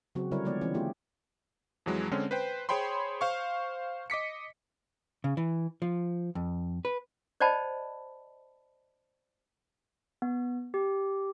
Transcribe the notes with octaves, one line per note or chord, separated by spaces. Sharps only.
C#3 F#3 C4 F#4
D3 G3 C4 E4 A#4 C#5
F3 G#3 B3 G4 C#5 D5
E3 C4 C#4
A3 A#3 D4 F4 G4 G#4
F2 E3 F#3 G#3
D3 G#3 C4 C#4
B4 C5 G5
G#4 C5 C#5 G5 B5 C6
C5 F5 C#6
D#5 D6 B6 C#7
C#3
E3
F3
F2
B4
C5 D5 D#5 G5 A5 B5
B3
G4